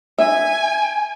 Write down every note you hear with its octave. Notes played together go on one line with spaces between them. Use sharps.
E5 G#5